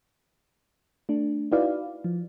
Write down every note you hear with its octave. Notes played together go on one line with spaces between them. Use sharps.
A3 D4
D#4 E4 F#4 B4 D5 F5
F3